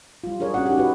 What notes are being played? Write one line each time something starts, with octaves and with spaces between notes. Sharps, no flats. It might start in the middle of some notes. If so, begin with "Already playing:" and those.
G3 F4
D4 G#4 A#4 C#5
C#4 F#4 F#5
D#4 G4
F#4 B4